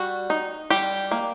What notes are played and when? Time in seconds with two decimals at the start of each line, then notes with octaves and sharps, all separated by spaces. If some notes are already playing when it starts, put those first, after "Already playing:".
Already playing: G3 F#4
0.30 D#4
0.70 G3 G4
1.11 A#3